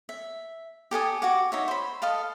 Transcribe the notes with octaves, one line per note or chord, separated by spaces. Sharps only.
E5
G4 A4 G#5 D#6
F#4 F#5 D6
D#4 C#5 E5
C5 B5
A4 D#5 F5 A5